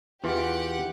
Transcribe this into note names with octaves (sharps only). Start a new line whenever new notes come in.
E2 E3 F4 G4 F#5